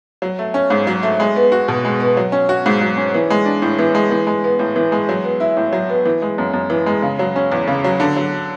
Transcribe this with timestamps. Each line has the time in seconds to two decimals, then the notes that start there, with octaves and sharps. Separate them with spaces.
0.22 F#3
0.39 A3
0.54 C#4
0.70 G#2
0.87 F#3
1.03 A3
1.20 G#3
1.36 B3
1.52 F#4
1.68 B2
1.85 G#3
2.00 B3
2.17 F#3
2.32 C#4
2.49 F#4
2.66 G#2
2.81 F#3
2.97 C#4
3.14 E3
3.30 G#3
3.46 D4
3.62 A2
3.79 E3
3.95 G#3
4.11 E3
4.27 G#3
4.44 B3
4.59 A2
4.76 E3
4.92 G#3
5.09 F#3
5.24 B3
5.40 E4
5.57 A2
5.73 F#3
5.89 B3
6.05 E3
6.22 G#3
6.38 F#2
6.54 F#2
6.70 E3
6.86 G#3
7.02 C#3
7.19 F#3
7.36 C#4
7.52 E2
7.67 C#3
7.84 F#3
8.00 D3
8.17 F#3